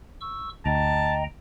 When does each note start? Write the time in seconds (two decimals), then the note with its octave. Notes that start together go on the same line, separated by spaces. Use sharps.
0.21 C#6 E6
0.66 D2 D#5 G5 A5 A#5